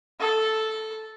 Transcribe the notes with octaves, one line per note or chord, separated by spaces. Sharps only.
A4